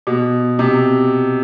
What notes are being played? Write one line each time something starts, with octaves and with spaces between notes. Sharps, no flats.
B2
C3